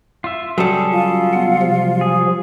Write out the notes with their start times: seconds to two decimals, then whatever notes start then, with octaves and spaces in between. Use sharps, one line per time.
0.24 F4 E5
0.58 C#3 F#3 G3 G#4 A4
0.92 F4
1.33 B3 F#5
1.62 C3 F3
2.01 G#4